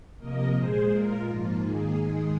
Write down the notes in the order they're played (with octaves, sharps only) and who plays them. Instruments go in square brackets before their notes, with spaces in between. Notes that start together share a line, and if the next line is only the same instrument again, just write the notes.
[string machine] C3 F3 A#3 A#4 D#5
A#2 G#3 G#4 C5
A#2 G#3 F4 A#4
G#2 F3 A#3 F4
G#2 D#3 A#3 G#4
G#2 D#3 G#3